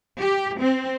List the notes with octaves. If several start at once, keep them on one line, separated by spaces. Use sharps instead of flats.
G4
C4